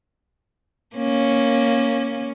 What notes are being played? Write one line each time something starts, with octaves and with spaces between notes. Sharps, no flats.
A#3 C#4